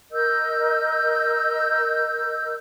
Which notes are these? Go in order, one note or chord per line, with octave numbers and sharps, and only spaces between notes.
A#4 D#5 E6 G6